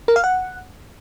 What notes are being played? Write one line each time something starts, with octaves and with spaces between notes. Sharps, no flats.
A#4
F5
F#5